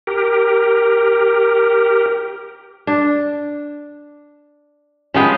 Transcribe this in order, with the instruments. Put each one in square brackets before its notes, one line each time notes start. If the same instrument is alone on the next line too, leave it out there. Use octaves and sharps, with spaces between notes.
[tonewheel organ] G4 A#4
[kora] D4
[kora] F3 B3 G5 [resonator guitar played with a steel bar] G#3 C#4